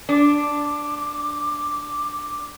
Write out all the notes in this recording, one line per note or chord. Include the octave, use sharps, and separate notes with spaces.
D4 D6